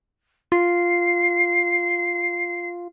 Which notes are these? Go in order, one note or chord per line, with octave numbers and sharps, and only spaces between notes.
F4 C7